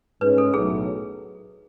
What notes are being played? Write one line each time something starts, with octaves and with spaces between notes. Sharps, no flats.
G#2 G#3 C#4 B4
A4
B1 A2 F#3 G#4